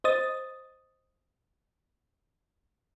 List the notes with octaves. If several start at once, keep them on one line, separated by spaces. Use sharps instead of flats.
C5 D#5 D#6 A6